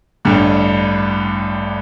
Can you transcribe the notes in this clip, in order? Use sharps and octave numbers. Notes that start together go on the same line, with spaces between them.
A1 G2 D3